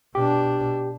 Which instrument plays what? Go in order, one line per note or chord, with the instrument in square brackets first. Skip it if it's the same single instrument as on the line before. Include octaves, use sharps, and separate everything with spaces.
[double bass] B2 D4 [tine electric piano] G4